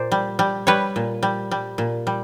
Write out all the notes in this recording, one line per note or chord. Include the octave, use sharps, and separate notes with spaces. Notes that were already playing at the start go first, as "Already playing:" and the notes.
Already playing: A#2 C5 D5
G3
G3
G3 B4 C#5
A#2
G3
G3
A#2
G3